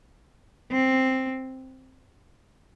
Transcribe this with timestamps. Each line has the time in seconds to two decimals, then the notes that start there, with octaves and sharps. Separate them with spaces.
0.72 C4